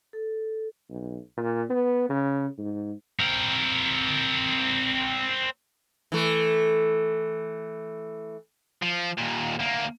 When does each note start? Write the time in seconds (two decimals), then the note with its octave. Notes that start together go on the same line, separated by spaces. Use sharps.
0.13 A4
0.90 B1
1.37 A#2
1.70 B3
2.09 C#3
2.58 G#2
3.20 C4 A#4
6.12 E3 A3
8.83 F3
9.18 D#2 A#2
9.59 D2 A#3